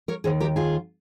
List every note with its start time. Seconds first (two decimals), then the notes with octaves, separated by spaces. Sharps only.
0.08 A#4 C#5
0.24 D#2 D#3 G#4 C5
0.40 G4 A#4
0.56 F4 G#4